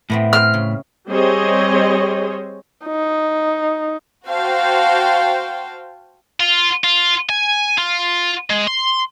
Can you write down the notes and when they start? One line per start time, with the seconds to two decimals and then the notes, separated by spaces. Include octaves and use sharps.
0.10 A2 A3 B3 C4
0.33 C4 C5 F6
0.54 C#3
1.09 G3 C4 G#4 C5 C#5 D#5
2.86 D#4
4.26 F#4 C5 F5 G5 A5
6.40 F4
6.84 F4
7.30 G#5
7.78 F4
8.50 G#3
8.67 C6